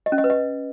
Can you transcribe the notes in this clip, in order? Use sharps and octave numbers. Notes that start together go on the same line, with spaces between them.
D#5
C#4
D#5
B4
D#5